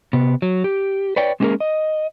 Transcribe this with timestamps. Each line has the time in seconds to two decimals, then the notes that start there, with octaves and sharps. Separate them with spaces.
0.13 C3 B3
0.42 F#3
0.64 G4
1.16 B4 C#5 D5 G5
1.40 G#3 A#3 C#4 G4 G#4 A#4
1.60 D#5